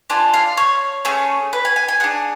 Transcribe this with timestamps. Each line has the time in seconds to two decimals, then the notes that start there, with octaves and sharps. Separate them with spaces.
0.10 D4 F4 A4 G#5
0.34 F5
0.57 C#5
1.05 A3 C#4 G#4
1.53 B4
1.65 G#5
1.76 G#5
1.88 G#5
2.00 D4 G#4 F#5